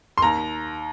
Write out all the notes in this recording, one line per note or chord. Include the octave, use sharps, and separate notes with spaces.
C6
D#2 A#5